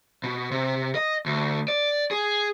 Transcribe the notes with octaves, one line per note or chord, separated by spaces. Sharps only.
B2
C3
D#5
D2
D5
G#4